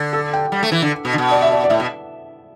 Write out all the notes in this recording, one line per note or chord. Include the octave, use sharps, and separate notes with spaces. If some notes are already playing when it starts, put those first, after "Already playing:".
Already playing: D3
A4
G5
G3
A3
E3
D3
B2
D3
B2
D5
E5
D5
D5
A2 E5
B2